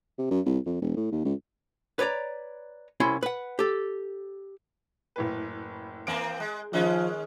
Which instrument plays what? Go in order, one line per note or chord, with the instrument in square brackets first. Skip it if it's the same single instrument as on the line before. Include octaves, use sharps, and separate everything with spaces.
[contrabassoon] C3
F#2
C2
F2
E1
A2
D#2
C#2
[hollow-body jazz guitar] B4 C#5 D5 A#5
C2 C#4 E4 C6
B4 F#5
G4 A4
[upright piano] F#1 A2 B4
[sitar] E3 A#3 C4 [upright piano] D7
[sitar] G#3
[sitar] D#3 G#3 C#4 [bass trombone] F3